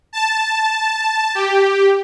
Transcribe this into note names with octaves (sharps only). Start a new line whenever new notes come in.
A5
G4